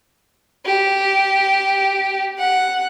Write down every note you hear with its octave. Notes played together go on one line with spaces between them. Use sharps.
G4
F#5